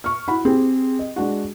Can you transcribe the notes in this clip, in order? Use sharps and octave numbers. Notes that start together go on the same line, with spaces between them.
C#6 F6
E4 F#4 F#5 B5
C4 G4 G#4
D#5
G#3 D4 F#4